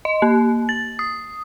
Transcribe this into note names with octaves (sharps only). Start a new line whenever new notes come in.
D#5
A#3
A6
D#6